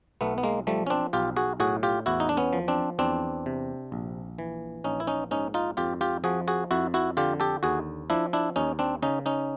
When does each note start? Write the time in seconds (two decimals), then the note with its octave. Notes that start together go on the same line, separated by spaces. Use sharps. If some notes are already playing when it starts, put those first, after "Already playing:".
0.21 B1 A3 B3
0.38 B3
0.43 G#3 A#3
0.67 F3 G3 A3
0.87 C#4
0.90 C4 D4
1.13 B1 F4 G4
1.37 F#4 G#4
1.60 A2 F#4 G#4
1.83 F4 G4
2.06 E2 E4 F#4
2.20 D#4
2.29 D4
2.37 B3 C#4
2.53 F3
2.68 C4 D4
2.99 E2 C4 D4
3.46 C3
3.92 A#1
4.39 E3
4.84 A#1 C#4 D#4
5.00 E4
5.07 C#4 D#4
5.31 G#2 C#4 D#4
5.54 D#4 F4
5.77 F2 F4 G4
6.01 F4 G4
6.24 F3 F#4 G#4
6.48 F#4 G#4
6.71 F2 E4 F#4
6.94 E4 F#4
7.17 D3 F4 G4
7.40 G4 A4
7.63 D#2 F#4 G#4
8.10 F3 D4 E4
8.33 D4 E4
8.56 D#2 C#4 D#4
8.79 C4 D4
9.02 C#3 C#4 D#4
9.26 C#4 D#4